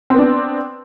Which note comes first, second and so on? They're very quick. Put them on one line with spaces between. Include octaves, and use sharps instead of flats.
C4 B3 D4